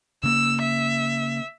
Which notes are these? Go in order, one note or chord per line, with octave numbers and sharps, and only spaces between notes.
C#3 A#3 E6
E5